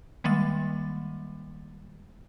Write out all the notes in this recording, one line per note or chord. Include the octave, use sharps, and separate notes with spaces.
D#3 G3 G#3 A#3 A6